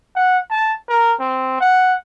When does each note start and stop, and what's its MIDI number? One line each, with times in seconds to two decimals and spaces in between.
0.16 0.39 78
0.50 0.75 81
0.89 1.14 70
1.20 1.56 60
1.61 1.95 78